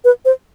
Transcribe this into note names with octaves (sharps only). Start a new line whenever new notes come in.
B4
C5